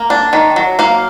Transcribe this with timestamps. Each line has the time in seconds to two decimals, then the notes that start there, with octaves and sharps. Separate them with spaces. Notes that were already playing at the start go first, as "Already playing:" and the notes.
Already playing: A#3
0.10 D4
0.33 D#3
0.56 F#3
0.79 A#3 F5